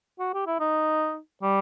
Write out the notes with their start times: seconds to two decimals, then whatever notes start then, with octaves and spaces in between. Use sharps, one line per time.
0.19 F#4
0.34 G4
0.47 E4
0.60 D#4
1.43 G3